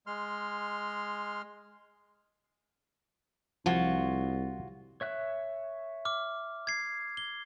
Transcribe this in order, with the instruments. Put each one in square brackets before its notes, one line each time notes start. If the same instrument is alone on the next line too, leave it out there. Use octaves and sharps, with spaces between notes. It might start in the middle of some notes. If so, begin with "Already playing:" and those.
[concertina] G#3 C6 F6
[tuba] C2 [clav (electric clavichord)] F3 [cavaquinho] F4 F#4 C#5
[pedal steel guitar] C#5 E5 F#6
[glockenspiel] D6 F6
G#6 C7
G7